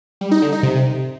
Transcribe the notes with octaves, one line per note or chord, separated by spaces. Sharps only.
G3
D#4
D3
D#4
C3